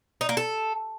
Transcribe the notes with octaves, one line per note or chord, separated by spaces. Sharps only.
D#4
A#3
A4